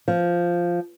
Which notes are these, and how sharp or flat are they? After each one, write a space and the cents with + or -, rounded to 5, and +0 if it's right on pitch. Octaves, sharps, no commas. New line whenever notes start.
F3 -5